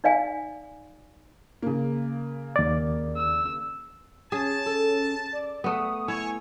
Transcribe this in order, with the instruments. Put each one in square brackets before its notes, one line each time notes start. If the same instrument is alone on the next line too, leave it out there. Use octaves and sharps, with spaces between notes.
[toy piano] D#4 D5 F5 G#5
[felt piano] C#3 A#3
[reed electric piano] D#2 D5
[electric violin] E6
[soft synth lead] C#4 [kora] G#4 [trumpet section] A5
[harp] A4
[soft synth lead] D5
[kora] A3 B3 [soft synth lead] D#6
[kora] E4 [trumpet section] C#5 [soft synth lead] G#5